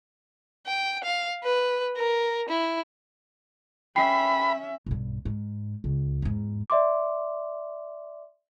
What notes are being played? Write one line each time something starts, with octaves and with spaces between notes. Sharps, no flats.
G5
F5
B4
A#4
E4
C#4 E5 G5 B5 C7
B1 G2
G#2
C#2
E2 G#2
D5 E5 C6 D6